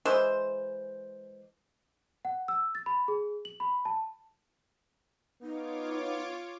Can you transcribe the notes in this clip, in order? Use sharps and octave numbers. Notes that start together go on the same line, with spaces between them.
E3 G#3 C5
F#5
E6
A6
B5
G#4
F#7
B5
A5
B3 D#4 F4 C#5 D6